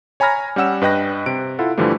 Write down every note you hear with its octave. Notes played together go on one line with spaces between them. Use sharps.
C#5 G#5 A#5 B5 F6 A#6
G3 C#4 F#5 E6 E7
G2 B4 D#5 G5 F#6 A#6
C3 D7
E4 F4 A4 F#5
G2 D3 E3 F3 G3 A3